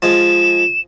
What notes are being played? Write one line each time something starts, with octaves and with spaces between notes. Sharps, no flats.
F3 G#3 E7